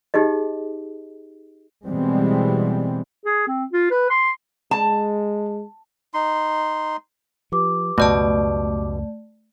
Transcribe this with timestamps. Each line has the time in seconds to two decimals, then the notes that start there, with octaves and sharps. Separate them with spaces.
0.14 D#4 G4 G#4 D#5
1.85 B2 E3 G3 G#3 C4
3.26 G#4
3.47 C4
3.73 F4
3.91 B4
4.10 C6
4.71 G#3 A5
6.14 D#4 C6
7.52 F3 G4 B4 D6
7.98 C#2 F#2 B2 A3 D5 A5